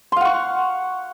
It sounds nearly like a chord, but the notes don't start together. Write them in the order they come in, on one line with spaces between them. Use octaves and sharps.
C6 F5 F#5 C#6